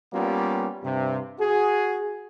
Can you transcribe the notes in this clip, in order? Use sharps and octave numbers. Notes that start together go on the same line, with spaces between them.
G3 A#3 B3 C#4 F4
G2 C3
F#4 G#4